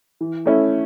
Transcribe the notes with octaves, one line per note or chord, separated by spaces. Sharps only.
E3
A3 C#4 E4